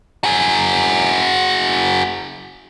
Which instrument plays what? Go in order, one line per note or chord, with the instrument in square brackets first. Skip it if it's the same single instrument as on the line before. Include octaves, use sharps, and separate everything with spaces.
[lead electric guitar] F#4 G#4